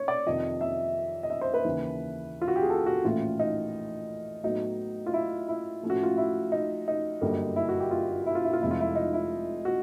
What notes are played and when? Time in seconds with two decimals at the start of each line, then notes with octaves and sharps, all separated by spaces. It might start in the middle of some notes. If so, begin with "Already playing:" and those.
Already playing: C#5
0.08 D5
0.26 F2 C3 D#3 D#5
0.61 E5
1.23 D#5
1.30 E5
1.41 C5
1.54 B4
1.65 D#2 C#3 E3
2.42 F4
2.48 F#4
2.56 G4
2.62 G#4
2.70 A4
2.86 F#4
3.04 A#1 A2 E3 A3 C#4 F4
3.39 D#4
4.44 A2 F#3 B3 D#4
5.06 F4
5.14 E4
5.48 E4
5.83 A2 F3 A3 C#4
5.90 F#4
6.03 F4
6.17 E4
6.52 D#4
6.88 D#4
7.21 G1 F#2 D3 G3 A#3
7.56 E4
7.69 F#4
7.80 G4
7.91 F4
8.26 E4
8.35 F4
8.45 E4
8.53 F4
8.61 F1 F2 C3 F3 G#3 E4
8.71 F4
8.80 E4
8.96 D#4
9.13 E4
9.65 F#4